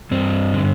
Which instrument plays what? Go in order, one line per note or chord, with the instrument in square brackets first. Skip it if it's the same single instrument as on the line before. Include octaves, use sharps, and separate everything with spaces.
[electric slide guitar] G2 C4
D3